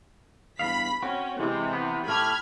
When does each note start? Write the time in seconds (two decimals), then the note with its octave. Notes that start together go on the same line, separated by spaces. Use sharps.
0.59 E2 G2 F5 B5 B6
1.02 C4 C#4 F#4
1.39 C3 E3 G#3
1.73 B3
2.07 A2 A3 G4 B5 F6 G#6